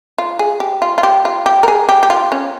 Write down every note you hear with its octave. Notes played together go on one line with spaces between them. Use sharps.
F4
G#4
G4
F4
F4
G4
F4
G4
A#4
G#4
G4
G4
F4
C#4